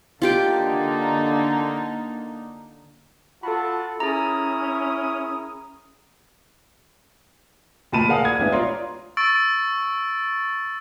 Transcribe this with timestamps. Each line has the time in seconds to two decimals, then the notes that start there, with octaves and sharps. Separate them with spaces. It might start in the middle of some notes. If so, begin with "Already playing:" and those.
0.22 D3 A#3 D#4 F4 G4 G5
3.43 F4 F#4 A4 A5 B5
4.00 C#4 E4 G#4 A#4 A#5 D#6
7.92 D2 A#2 A5 B5 D#7
8.08 G#4 A#4 D5 F5 F#5 D#6
8.25 G#6
8.39 A1 G#3 B3 D4 E5
8.52 F4 C#5 D5 A#5 C6
9.17 C#6 E6 A6 D7